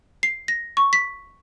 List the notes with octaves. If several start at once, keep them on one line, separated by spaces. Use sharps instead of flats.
C7
A#6
C#6
B6